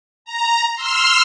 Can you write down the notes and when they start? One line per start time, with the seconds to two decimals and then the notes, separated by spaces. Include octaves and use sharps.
0.25 A#5
0.75 C6 E6 F6